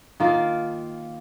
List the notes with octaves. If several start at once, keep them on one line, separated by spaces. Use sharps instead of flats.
D#3 A#3 F4 A#4